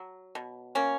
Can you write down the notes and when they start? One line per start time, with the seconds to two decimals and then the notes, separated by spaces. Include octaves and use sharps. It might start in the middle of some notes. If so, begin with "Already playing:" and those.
Already playing: F#3
0.35 B2
0.75 A#3 C#4